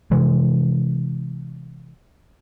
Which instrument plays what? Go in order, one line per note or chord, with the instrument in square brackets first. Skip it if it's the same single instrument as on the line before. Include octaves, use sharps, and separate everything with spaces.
[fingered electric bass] C3 E3 G#3